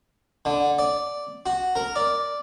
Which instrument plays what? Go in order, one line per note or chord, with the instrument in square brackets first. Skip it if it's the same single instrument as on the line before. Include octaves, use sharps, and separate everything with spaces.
[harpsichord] D3
D5
F#4
A#4
D5